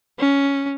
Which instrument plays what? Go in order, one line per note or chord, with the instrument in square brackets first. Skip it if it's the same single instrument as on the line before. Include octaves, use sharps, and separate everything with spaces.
[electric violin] C#4